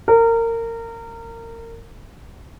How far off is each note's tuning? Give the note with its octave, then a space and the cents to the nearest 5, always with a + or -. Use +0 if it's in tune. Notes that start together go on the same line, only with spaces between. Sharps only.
A#4 -25